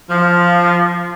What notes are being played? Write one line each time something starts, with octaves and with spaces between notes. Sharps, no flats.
F3